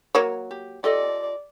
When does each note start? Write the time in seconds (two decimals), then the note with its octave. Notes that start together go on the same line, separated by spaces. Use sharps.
0.15 F#3 A#3 C#5
0.51 G4
0.84 F4 G4 A4 D5 D#5